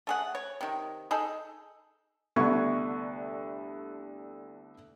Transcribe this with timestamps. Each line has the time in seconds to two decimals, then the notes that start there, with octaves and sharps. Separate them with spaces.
0.07 A3 G#4 F#5
0.35 C#5
0.61 C3 D#3
1.11 D#4 G#4 A4
2.36 C2 D3 A3 B3 C#6 G#6